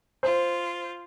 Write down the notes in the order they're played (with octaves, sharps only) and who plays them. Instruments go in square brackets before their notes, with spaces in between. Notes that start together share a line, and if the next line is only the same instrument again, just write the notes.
[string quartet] F4 [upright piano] C5